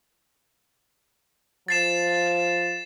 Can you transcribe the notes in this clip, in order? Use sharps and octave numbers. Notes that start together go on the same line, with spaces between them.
F3 A6 C7 E7